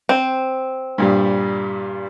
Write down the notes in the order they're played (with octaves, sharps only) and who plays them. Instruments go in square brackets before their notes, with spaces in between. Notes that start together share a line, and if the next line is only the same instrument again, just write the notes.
[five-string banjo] C4
[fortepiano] G2 A#2 G3